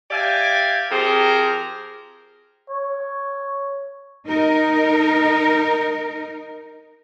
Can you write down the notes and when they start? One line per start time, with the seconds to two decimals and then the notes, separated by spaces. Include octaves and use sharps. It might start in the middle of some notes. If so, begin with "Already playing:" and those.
0.11 G4 D5 E5 F5 G5 G#5
0.90 F3 C4 G4 G#4 A#4
2.70 C#5
4.27 D#4 A#4